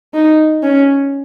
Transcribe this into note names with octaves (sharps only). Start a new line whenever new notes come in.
D#4
C#4